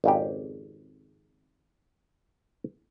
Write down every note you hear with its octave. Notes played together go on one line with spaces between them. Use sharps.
G#1 F2 C#3 G4